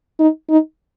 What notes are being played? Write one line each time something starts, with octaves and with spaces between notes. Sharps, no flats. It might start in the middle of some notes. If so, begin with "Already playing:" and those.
D#4
D#4